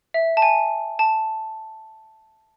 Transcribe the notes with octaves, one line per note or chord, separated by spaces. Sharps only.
E5
A5
G#5
A5